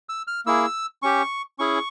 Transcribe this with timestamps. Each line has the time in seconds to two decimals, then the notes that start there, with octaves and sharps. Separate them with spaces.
0.09 E6
0.27 F6
0.46 A#3 E4 G#4 E6
1.02 C#4 G4 C#6
1.59 C#4 E4 G#4 C#6